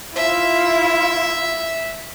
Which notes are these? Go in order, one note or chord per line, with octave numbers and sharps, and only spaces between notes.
E4 F4 E5